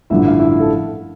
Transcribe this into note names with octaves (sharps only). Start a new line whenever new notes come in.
A1 G2 D3 F3 E4 E5
F5
E4 E5
A4